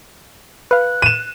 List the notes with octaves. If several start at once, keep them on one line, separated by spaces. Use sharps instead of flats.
B4 F5 F#6
D#7 E7